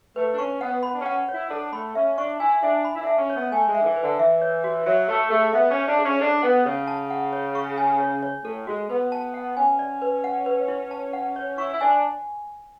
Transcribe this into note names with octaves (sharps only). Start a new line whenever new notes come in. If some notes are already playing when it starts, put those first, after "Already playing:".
A3 B4
D4
C#4 C#6
B3 F#5
B3 B5
D4
C#4
F#5
E4 C#5
D4 A4
A3 B5
C#4 E5
D4 C#6
E4 G#5
D4 E5
B5
E4
D4
E5
C#4
C#5
B3
A3 G#5
G#3
E5
D3
E3
B4
D3
E3 E5
C#5
F#4
F#3 E5
A3 C#5
A3 G#4
B3 E5
C#4
C#5
D4
G#4
C#4
D4 A4
B3 F#5
C#3 C#5
A5
F#5
C#5
C#6
G#5
C#5
C#5
A2 A4
G#3 F#4
B3 B4
A5
F#5
C#4 G#5
D5
B4
F#5
B4
E4
A5
F#5
C#5
E4 C#6
E4
D4 G#5